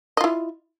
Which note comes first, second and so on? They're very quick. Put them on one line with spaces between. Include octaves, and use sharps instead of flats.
D#5 F4 E4